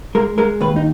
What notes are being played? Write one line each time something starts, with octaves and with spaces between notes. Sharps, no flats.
G#3 A#4
G#3 A#4
D#2 B4
D#4